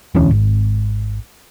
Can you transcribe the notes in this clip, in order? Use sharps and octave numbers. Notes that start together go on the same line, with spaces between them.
E1 D2 E3 C#4
G#1